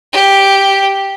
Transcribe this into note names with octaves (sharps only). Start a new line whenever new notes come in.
G4